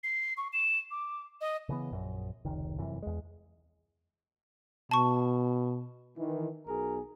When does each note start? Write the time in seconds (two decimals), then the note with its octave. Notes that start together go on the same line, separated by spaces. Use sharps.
0.04 C7
0.38 C#6
0.53 E7
0.91 D6
1.41 D#5
1.69 C#3 E3 B3
1.91 A#1 F#2
2.45 F1 C#2 D#3
2.78 F1 F#2 C3 E3
3.02 E2 G#3
4.91 B2 A5 C#6
6.17 D#3 E3
6.67 B1 B2 G#4 A#4